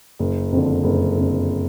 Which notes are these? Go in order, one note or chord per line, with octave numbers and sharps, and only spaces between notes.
F#1
F2 D3
F#1
F2 D3